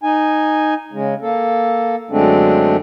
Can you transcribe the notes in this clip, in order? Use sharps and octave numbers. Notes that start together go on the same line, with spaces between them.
D#4 G#5
C#3 G#3
A#3 A4
F#2 D3 G#3 A3 C4 D4